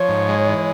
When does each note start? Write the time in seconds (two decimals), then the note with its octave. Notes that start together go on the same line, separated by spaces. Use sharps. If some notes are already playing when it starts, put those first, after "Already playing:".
Already playing: F3 C#5
0.09 G#2
0.28 G#3
0.48 E3